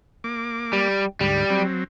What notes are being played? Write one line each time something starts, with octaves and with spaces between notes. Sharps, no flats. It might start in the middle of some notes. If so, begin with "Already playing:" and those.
A#3 D6
G3
D2 G#2 G3
F#3 C4